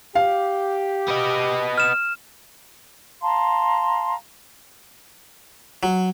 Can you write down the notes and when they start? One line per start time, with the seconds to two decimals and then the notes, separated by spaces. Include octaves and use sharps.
0.15 G4 F5
1.08 B3 D#5
1.78 F6 E7
3.22 F5 A5 A#5 C6
5.83 F#3